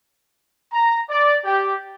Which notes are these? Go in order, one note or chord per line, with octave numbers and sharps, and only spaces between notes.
A#5
D5
G4